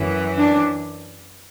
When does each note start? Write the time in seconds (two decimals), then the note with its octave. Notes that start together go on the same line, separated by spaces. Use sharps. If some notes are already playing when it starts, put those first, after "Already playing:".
Already playing: F#2 E3
0.37 D4